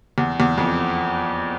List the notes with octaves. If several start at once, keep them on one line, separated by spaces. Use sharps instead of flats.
E2
E2
F2